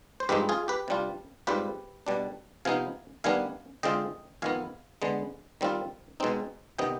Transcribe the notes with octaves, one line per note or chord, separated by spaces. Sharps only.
C5
G2 F3 G#3 C4 D#4 G4 B4
F4 G#4
G4 B4
C3 G3 D4 F4
G#2 G3 C4 F4 G4 B4
B2 G3 D4
C3 F3 B3 D#4 F5 G#5
D#3 G3 B3 D4 F5 G#5
D3 G#3 C4 F4 D#5 G5
F2 D#3 B3 F5 G#5
D3 G#3 B3
D#3 G3 C4 F4
B2 G#3 C4 D#4
C3 D#3 B3 D#5 G5